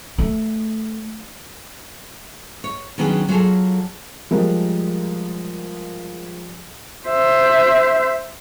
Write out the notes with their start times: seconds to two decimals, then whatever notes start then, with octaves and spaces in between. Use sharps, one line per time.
0.18 A3
2.64 C#5
2.98 D#3 F#3 B3 C#4 D4 G#4
3.28 F#3 F4 G#4 A4
4.31 F3 G3 G#3 A#4
7.09 C5 E5